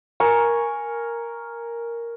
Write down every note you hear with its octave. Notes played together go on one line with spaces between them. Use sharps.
A#4 G#5 C#6